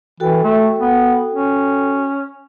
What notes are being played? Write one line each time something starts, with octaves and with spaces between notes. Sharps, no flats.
E3 F#4 A4 G5
A3
B3
C#4